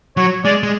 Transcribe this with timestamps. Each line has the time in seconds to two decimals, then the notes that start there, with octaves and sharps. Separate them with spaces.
0.17 F#3 C#5
0.45 G#3 D5
0.63 G#3